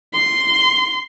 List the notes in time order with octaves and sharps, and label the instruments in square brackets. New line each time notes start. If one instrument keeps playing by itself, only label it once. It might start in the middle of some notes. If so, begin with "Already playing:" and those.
[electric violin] C6